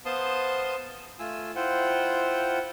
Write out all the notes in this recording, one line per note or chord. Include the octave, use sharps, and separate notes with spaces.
B3 C5 F5 A5 C6 D#6
A3 F4 G#5 E6
E4 F4 C5 F#5 G5